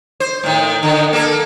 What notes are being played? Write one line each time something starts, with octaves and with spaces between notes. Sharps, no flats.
C5
A2 D#3
D3 D#3
A#3 A4